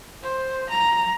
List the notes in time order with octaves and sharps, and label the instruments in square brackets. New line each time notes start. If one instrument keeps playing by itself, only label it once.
[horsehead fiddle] C5
A#5